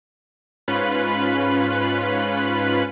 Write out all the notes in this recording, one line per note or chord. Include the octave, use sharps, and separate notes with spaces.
G#2 C#4 F4 B4 B5 F#6